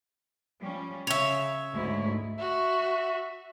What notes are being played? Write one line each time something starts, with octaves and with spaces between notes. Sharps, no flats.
F3 G3 C#4
C#3 C#5 E5
D2 G#2 E4
F#4 E5